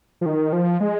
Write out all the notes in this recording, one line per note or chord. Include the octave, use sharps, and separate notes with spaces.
F3
D#3
F3
G#3